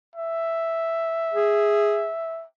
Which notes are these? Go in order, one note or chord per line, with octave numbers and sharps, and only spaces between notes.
E5
G#4